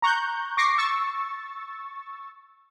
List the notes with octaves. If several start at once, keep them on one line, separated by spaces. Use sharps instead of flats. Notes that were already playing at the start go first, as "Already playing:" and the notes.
A#5 C#6 F#6 G6
C#6 D6 A#6 C7
C#6 E6 A6